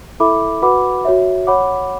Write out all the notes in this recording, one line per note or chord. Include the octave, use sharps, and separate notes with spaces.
E4 A4 E5 B5 D6
F#4 B4 F#5 B5 D6
F#4 C#5 E5
C#5 F#5 B5 D6